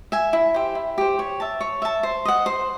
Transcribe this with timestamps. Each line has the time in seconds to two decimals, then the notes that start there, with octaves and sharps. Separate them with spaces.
0.12 E5 G#5
0.33 E4
0.54 G4 C5
0.75 E4
0.98 G4 C5
1.19 C#5
1.40 E5 A5
1.60 C#5
1.82 E5 A5
2.03 C5
2.25 D#5 F#5
2.46 C5